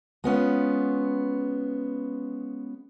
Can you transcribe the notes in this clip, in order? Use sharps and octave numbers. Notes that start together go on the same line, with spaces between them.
G#3 B3 C#4 F4